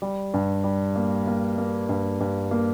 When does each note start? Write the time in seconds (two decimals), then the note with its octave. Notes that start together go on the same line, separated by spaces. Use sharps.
0.02 G3
0.34 G2
0.64 G3
0.96 A#3
1.27 A#3
1.58 A#3
1.89 G2
2.20 G2
2.51 A#3